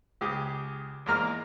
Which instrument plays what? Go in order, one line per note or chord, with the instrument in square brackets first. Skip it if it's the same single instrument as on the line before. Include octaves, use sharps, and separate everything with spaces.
[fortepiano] C#2 G4 G#4
E2 G#2 G#3 A#3 A#5 F6